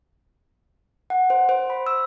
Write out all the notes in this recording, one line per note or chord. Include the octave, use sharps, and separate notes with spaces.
F#5
C5
C5
B5
E6